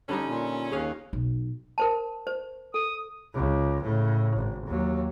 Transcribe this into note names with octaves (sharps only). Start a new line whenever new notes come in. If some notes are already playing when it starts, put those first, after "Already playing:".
F2 D3 G3 C#4 D#4
A#2
D#2 G#4 C#5 F5
B1
A#4 C5 A5
C5
A4 D#6
C#2
A2 C#3
G#1
D#2 F#3